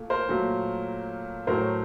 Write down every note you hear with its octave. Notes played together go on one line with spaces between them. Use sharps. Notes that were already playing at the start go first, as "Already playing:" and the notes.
Already playing: A#2 A3
A#4 C5
A#2 F#3 A3
A2 F#3 A3 A#4 C5